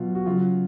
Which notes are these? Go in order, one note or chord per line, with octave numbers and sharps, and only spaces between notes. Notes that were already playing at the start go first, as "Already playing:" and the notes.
Already playing: B2 F#3 F4
F#4
C#3 F#3 F4